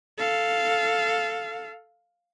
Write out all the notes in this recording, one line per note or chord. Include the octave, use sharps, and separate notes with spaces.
A4 F5